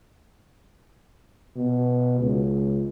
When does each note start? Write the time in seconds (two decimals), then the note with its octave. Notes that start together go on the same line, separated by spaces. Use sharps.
1.56 B2
2.20 C#2